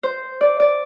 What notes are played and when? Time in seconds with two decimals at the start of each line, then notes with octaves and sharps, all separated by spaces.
0.03 C5
0.41 D5
0.60 D5